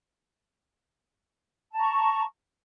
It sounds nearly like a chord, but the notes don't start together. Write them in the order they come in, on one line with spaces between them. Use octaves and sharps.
A5 A#5 C#6